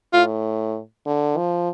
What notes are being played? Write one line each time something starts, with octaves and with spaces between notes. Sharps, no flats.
A2 F4
D3
F3